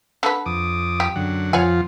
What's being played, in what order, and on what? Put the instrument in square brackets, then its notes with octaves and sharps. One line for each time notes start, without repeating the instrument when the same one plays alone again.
[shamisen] D3 A4 B4
[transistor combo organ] F2 D6 D#6
[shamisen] G4
[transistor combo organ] F#2 D3 F#5
[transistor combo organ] F2 F3 F4 [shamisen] C#5 F#5 G#5